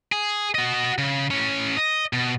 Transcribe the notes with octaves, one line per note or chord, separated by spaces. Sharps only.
G#4
F#4 D#5
C#3
A2 C#4
D#5
B2